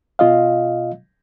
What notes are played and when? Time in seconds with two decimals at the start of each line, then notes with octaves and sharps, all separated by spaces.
0.19 B2 F4 D#5 F5